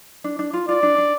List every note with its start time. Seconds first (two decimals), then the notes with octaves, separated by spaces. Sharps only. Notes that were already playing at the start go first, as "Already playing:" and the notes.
0.24 D4
0.39 D4
0.53 F4
0.68 F4 D5
0.83 D4
0.98 D4